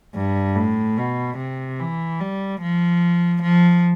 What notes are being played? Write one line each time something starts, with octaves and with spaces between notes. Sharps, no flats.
G2
A2
B2
C3
E3
G3
F3
F3